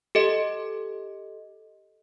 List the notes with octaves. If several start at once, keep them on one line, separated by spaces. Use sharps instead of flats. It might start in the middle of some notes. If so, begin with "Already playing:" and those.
G4 A4 D#5